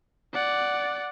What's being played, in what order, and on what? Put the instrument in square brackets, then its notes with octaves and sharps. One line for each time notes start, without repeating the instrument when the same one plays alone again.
[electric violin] D5 F#5